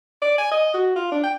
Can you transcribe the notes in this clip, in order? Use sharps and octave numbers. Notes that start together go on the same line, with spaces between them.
D5
G#5
D#5
F#4
F4
D4
G5